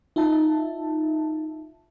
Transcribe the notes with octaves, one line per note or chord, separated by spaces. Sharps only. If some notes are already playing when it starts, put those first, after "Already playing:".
D#4 F4 E5 A5